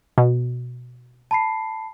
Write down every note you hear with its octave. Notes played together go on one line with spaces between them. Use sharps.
B2
A5 B5 C7